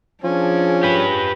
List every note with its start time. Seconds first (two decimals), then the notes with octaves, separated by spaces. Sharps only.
0.24 F3 C#4 D4 G#4
0.83 G4 B4